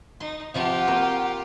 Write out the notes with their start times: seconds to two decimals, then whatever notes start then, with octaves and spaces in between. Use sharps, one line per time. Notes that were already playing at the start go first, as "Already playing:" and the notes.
0.20 D#4 C6
0.54 C3 F3 F4 G4 F#5
0.87 A#3 C4 F#4